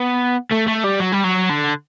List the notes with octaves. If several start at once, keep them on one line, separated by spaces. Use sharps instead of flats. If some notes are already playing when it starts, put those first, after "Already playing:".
Already playing: B3
A3
A3
G3
F#3
G3
F#3
D3